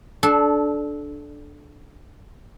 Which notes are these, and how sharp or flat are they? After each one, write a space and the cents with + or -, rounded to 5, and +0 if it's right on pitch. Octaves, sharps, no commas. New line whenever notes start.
D4 +0 A4 -20